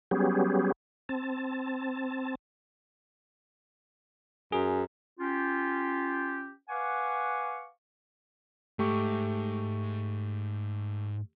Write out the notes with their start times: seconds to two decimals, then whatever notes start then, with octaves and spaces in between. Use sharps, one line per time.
0.11 F#3 G3 B3 C#4 G4 G#4
1.09 C4 A5
4.52 F#2 G#4
5.19 C#4 F4 G4
6.69 B4 F5 F#5 G#5 C#6 D6
8.79 G#2 A3 G4 C#6